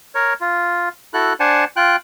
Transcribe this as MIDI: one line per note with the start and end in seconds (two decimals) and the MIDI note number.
0.15 0.34 70
0.15 0.34 73
0.41 0.89 65
1.14 1.33 64
1.14 1.33 66
1.14 1.33 69
1.14 1.33 90
1.40 1.64 62
1.40 1.64 72
1.40 1.64 78
1.40 1.64 80
1.40 1.64 81
1.76 1.96 65
1.76 1.96 79
1.76 1.96 90